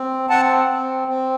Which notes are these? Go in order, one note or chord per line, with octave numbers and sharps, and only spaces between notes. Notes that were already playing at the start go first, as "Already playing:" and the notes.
Already playing: C4
C4 F#5 A5
C4
C4